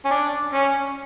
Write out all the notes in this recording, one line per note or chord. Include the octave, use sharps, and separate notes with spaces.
C#4
D4
C#4